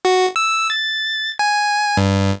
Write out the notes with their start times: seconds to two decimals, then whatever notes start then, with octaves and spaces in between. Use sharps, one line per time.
0.05 F#4
0.36 E6
0.70 A6
1.39 G#5
1.97 G2